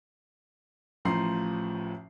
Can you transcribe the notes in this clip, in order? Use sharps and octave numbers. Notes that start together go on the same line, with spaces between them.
A1 A2 F3 A#5 C6 C7